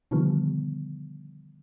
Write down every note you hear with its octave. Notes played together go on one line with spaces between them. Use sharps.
B2 D3 D#3 F3 G3 B3